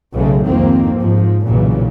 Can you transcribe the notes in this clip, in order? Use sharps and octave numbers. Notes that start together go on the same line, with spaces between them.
B1 C#3 G#3 A3
C2 F2 G#2 D#3 A#3 C4
G#2 F3
B1 G2 A#2 C#3 E3